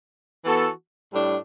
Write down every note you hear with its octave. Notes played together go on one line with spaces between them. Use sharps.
E3 B3 F#4 A4
A2 G3 D4